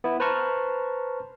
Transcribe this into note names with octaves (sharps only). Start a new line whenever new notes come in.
B3 E4
B4 C5 A5 A#5 C#6 F6